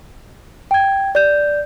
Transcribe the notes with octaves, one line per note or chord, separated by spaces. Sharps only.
G5 G#6
D5 G6